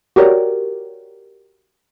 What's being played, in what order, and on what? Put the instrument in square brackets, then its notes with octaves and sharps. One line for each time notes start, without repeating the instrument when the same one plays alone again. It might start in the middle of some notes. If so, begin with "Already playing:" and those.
[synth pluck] F#4 G4 A#4 C#5 D5